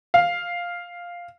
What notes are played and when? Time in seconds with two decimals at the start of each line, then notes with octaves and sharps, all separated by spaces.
0.14 F5